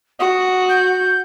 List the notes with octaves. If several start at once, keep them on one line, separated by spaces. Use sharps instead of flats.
F#4 D#6
G6